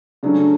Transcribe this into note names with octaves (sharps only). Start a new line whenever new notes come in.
C#3 F#3 A3 C#4 D4